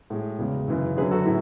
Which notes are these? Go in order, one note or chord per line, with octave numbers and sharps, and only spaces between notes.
A2 G#3
E2 C#3 G#3
F#2 C#3 E3
F#2 D3 F#3 G#4 B4
F#4 A4
A2 E4